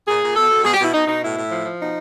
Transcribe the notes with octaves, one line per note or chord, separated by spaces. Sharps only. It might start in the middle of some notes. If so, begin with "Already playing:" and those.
A#2 G#4
A#2
B2 A4
B2
B2 G#4
G4
B2 E4
B2 D#4
B2 D#4
A2 E4
A2
F3
F3
B2 D#4